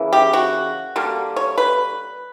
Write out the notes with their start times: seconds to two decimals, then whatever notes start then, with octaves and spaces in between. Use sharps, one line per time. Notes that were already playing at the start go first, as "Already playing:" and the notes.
Already playing: C#3 E3 A#3
0.13 G4
0.33 F#4
0.96 D3 G3 A#3
1.36 C#5
1.58 B4